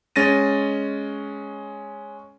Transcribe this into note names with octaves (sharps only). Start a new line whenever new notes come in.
G#3 C#4 A6 A#6 D#7